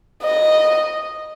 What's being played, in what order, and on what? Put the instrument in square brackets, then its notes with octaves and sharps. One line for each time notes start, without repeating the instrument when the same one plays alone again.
[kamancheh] D#5